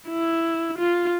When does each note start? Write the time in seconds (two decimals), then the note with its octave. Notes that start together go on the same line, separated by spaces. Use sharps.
0.09 E4
0.78 F4